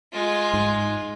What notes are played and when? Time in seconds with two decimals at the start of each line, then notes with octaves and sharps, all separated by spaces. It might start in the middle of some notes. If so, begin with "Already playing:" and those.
0.13 G#3 F4
0.54 G#2